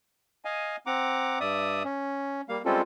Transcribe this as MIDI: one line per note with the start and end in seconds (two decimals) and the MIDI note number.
0.45 0.76 75
0.45 0.76 77
0.45 0.76 80
0.86 1.39 60
0.86 1.39 78
0.86 1.39 82
0.86 1.39 86
1.40 1.83 43
1.40 1.83 74
1.40 1.83 76
1.40 1.83 87
1.85 2.41 61
2.49 2.62 55
2.49 2.62 58
2.49 2.62 77
2.65 2.82 55
2.65 2.82 56
2.65 2.82 60
2.65 2.82 61
2.65 2.82 65
2.65 2.82 69